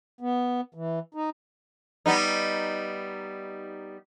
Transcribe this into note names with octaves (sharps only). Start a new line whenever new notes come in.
B3
E3
D#4
G3 B3 D#4